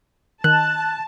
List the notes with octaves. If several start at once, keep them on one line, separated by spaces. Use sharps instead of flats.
D#3 A5 F#6